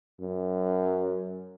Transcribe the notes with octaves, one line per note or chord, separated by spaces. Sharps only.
F#2